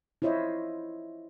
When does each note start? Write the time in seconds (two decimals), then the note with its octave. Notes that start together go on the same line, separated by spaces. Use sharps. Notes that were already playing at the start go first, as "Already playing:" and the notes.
0.22 E4 F4 C5 C#5 D#5 E5